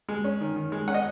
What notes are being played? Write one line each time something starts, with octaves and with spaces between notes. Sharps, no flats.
G#3
C#4
D#3
D#3
G#3
C#4 F#5
D#5